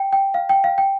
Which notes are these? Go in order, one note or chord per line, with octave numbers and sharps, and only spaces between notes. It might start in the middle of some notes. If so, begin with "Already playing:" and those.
Already playing: G5
G5
F5
G5
F5
G5